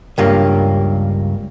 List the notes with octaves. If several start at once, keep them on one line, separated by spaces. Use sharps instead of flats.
C#2 G2 A#3